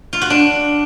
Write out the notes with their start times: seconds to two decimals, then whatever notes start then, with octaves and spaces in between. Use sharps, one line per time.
0.13 F4
0.21 F#4
0.30 D4